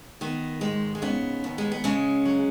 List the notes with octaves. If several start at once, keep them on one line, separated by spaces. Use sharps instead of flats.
D#3 B3
G#2 G#3
G#3
C#3 B3
D#2
G#3
B3
C#3 G#3 C#4
F#3